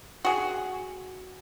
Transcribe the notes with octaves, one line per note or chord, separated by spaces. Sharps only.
F#4 G#4